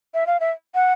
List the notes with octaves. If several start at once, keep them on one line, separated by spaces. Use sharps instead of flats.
E5
F5
E5
F#5